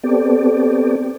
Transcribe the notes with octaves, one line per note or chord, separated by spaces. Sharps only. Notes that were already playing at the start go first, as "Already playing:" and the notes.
B3 C4 G4 A4 D5